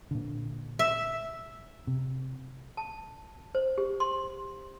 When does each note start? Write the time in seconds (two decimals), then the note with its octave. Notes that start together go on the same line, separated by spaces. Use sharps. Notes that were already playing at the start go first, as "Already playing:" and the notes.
0.11 A#2 D3
0.79 E5
1.87 C3
2.77 A5
3.55 C5
3.78 G4
4.00 C6